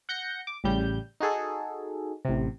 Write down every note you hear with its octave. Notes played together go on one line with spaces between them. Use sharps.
F#5 G6 A#6 C#7
D6
A1 C#3 G3 G6
D#4 F#4 G#4 A4
A1 C3